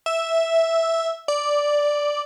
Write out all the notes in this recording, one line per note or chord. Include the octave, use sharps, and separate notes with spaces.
E5
D5